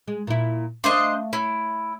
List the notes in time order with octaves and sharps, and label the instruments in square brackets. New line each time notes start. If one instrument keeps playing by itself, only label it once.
[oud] G#3
A#2 E4
[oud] A3 F5 [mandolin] D4 C5 D#5
[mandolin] E4 [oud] C#5